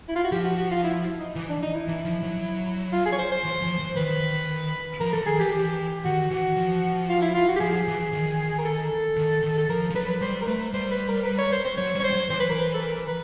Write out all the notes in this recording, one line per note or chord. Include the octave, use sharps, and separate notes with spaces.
E4
F4
F#4
F3 G4
F#4
F#4
F4
E4
D#4
E3
D4
D#4
E4
E3
F3
F#3
F4
G#4
C#5
C5
C5
E3
F3
E3
D#3 B4
F3 A#4
E3 A4
D#3 G#4
E3 G4
G4
D#3 F#4
E3
F3
F4
E4
F4
F#4
G4
F3 G#4
E3
D#3
A#4
A4
D#3
D#3
A4
F3 A#4
F3
F#3 B4
B4
G3 C5
A#4
A3 B4
G3 C5
B4
A#4
B4
C#5
C5
C5
F#3 C#5
G3 C#5
C5
F#3
E3 C5
B4
A#4
B4
A4
A#4
B4